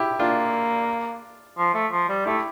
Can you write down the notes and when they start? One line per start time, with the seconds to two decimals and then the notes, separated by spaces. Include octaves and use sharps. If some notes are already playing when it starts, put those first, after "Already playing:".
Already playing: E4 G4
0.19 A#3 D4 F4
1.58 F3
1.74 A3
1.92 F3
2.09 G3
2.26 A3 E4 G4